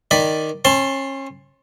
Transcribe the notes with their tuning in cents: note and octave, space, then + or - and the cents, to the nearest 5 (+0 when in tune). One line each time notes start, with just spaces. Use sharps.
D#3 +0 D5 +0 B5 +0
C#4 -35 A5 +0 C6 +0